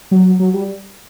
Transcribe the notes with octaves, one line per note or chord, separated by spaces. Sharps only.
F#3
F#3
G3